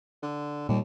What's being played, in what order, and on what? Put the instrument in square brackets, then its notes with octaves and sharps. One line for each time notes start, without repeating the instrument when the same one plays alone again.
[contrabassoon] D3
[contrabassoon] D#2 [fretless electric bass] A#2 G3